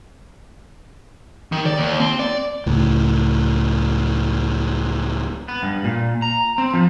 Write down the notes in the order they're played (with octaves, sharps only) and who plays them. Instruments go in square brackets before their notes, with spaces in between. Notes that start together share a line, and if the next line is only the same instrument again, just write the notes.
[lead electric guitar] D#3
D5
D#2
C4
D5
[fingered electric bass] C#2 A2
[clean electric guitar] B3
G2
A#2
A#5
C4
F3